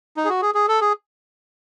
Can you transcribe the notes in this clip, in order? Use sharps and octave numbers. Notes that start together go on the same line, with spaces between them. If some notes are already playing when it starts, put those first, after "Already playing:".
D#4
G#4
F#4
G#4
G#4
A4
G#4